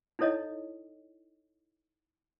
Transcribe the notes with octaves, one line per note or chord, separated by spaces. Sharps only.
D#4 E4 A4 C#5 D#5